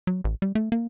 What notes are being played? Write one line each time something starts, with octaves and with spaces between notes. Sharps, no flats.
F#3
A1
G3
A3
A#3